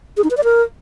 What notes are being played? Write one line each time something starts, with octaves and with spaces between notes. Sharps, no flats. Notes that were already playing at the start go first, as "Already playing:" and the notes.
G#4
D#4
B4
D5
A#4